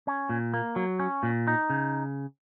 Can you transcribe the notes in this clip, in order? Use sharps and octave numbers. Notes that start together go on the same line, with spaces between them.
C#4
A#2
A#3
F#3
C#4
A#2
D#4
C#3